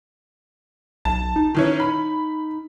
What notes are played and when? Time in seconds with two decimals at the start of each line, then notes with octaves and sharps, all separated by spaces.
1.05 B1 A5
1.36 D#4
1.55 D#3 E3 C#4
1.80 B5